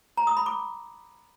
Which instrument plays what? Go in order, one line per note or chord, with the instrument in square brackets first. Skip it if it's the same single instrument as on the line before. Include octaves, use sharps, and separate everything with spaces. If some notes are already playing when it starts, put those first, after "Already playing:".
[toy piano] A#5
D#6
B5
D6